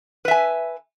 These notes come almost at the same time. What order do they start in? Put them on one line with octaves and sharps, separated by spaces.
B4 E5 G#5